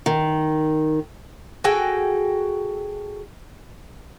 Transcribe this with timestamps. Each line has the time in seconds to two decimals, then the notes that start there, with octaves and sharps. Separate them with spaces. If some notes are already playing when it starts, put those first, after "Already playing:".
0.06 D#3
1.64 F#4 G#4 A4 G5